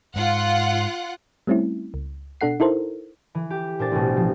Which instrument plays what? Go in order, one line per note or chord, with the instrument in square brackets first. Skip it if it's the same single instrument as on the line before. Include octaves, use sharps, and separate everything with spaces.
[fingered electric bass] G#2 [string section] F4 F#5
[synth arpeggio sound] G3 A3 C4 C#4 E4
C#2
B2 D4 A4 F#5 C7
D#4 E4 A4 A#4 C5
[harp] E3
G4
A#2 D4 C5 A6
A1 B2
F3